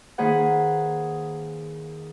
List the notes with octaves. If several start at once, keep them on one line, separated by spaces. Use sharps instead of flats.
D#3 A#3 G#4 B4 C5 F#5